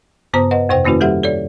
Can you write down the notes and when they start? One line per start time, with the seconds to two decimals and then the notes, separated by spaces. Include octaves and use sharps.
0.34 G2 C#3 B3 C5 A#5 D#6
0.51 B4 D#5 F#5
0.69 F2 C3 C5 G5
0.85 D#3 A#3 C#4 E4 F#4 B4
1.00 G3 G4 A4 E5 F#5
1.23 A4 C#5 D5